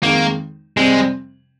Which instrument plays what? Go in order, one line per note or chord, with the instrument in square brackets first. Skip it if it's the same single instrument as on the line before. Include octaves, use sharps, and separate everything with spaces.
[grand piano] F2 D#3 G#3 D#4 [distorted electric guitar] A#3
[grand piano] F2 C3 G3 C4 [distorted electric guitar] G#3